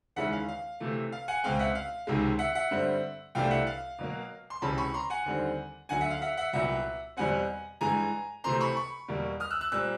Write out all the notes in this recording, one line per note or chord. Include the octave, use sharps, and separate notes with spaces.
D#2 C#3 E3 G#3 C#4 E5 F#5
F5
F5
C3 E3 A3
F5
F#5 G#5
C#2 B2 G#3 C4 F5 G5
E5 F#5
F5
C#2 C3 D#3 G#3
E5 F#5
E5 F#5
G2 D3 G3 C4
C2 C3 E3 A3 D4 F5 G5
E5 F#5
F5
B2 F#3 A#3
C6
C#2 C3 E3 G#3 C#4 A5 B5
B5 C#6
A#5 C6
F#5 G#5
D#2 D3 G3 C4
D2 D3 F#3 F#5 G#5
E5 F#5
F5
E5 F#5
E5 F#5
C2 A#2 F#3 B3 E5 F#5
E2 B2 G3 C4 F#5 G#5
G2 E3 G#3 G#5 A#5
C3 E3 A3 C4 A#5 C6
B5 C#6
B5 C#6
E2 B2 G3 A#3
D#6 F6
E6 F#6
E6 F#6
A#2 G3 C4 E6 F#6